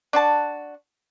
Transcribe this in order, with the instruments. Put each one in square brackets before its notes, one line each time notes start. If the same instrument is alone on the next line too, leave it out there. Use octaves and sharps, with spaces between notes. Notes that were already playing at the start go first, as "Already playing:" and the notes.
[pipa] D4 F#4 A5